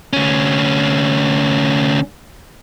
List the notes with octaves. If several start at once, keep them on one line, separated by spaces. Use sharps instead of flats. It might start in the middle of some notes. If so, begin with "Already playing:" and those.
D2 C#4